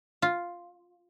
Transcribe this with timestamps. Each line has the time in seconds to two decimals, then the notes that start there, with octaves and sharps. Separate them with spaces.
0.22 F4